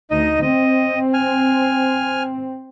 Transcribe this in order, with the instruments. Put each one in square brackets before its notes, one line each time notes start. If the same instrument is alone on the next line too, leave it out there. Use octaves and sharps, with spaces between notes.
[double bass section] D2 [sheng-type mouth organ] D#4 D#5
[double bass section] C4 [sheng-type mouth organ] D#5
[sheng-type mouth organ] G#5 F6